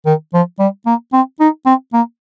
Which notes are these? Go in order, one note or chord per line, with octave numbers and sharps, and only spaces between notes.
D#3
F3
G3
A#3
C4
D#4
C4
A#3